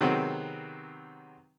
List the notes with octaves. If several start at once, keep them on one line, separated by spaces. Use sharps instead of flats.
C3 D#3 F#3 G#3 B3 C4